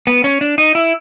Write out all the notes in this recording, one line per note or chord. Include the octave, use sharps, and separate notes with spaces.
B3
C#4
D4
D#4
E4